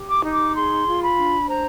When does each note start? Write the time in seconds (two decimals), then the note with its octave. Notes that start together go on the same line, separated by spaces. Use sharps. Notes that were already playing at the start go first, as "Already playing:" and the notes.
Already playing: G4
0.09 D6
0.24 D#4
0.32 D6
0.55 G#4 C6
0.86 F4
1.02 B5
1.18 D4
1.49 C5 A#5